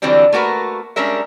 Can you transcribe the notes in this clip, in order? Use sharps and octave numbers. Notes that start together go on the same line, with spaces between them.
D3 E3 F#3 G3 C4 D4
A3 A#3 F#4 A#4 B4
G3 G#3 C#4 D4 A#4 E5